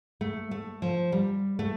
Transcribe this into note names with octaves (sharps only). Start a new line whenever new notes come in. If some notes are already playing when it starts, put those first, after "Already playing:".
A3
A3
F3
G3
A3